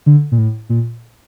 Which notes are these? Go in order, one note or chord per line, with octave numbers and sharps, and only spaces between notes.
D3
A#2
A2
A#2